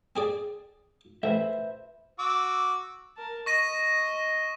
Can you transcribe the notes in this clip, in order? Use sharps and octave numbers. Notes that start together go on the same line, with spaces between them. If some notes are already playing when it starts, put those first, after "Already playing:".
C4 G#4 D5
A1 B4 C5 E5
F#4 D6 E6
A#4 A5
D#5 C#6 A#6 D#7